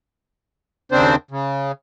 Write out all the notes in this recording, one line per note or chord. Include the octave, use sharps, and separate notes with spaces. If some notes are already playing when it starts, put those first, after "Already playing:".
D#2 C#3 C4 D4 C5
C#3